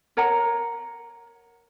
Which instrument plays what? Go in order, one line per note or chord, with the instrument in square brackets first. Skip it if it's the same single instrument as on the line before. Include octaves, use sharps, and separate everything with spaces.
[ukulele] A#4 C#5 F#5 A#5